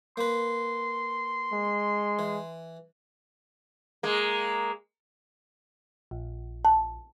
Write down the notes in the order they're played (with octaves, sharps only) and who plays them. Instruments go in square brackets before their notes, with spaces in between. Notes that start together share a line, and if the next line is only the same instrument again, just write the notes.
[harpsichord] A#3 B4 [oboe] C6
[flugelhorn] G#3
[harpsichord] E3
[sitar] G#3 A#3
[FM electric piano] A#1
[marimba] A5